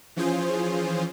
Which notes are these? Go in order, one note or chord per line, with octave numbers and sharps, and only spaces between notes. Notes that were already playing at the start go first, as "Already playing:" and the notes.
E3 F3 C#4 F4 G#4 C5